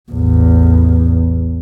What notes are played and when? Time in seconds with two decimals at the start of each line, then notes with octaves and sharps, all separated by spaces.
0.12 A1 E2